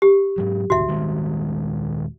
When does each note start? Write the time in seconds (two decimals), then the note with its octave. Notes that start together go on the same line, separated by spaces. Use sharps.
0.02 G4
0.38 G#2 F#3
0.70 G#1 D2 F#4 E5
0.88 D#1 D#3 G#3